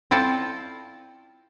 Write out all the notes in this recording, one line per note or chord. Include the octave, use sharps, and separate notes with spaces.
C4 E4 F4 A4 D5